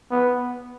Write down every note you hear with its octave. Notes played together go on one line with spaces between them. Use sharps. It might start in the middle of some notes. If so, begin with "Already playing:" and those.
B3